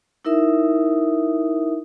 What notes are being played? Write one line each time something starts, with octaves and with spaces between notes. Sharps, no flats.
D#4 E4 A#4 E5 D#6